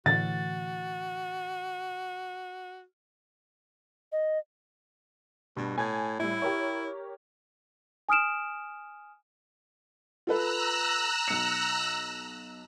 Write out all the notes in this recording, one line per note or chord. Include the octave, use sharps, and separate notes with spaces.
A2 D3 E3 F#4 A6
D#5
G2 B2
A2 G#5 G#6
A2 G3 E4
G4 A#4 C#5
G#5 D#6 F6 D7 E7
F4 A4 B4 A#5 E6 F#6
B1 C#7